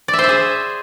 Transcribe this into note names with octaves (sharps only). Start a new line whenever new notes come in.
D5
E5
C5
E5
G#4